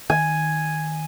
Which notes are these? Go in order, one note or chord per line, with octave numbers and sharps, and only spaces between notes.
D#3 G#5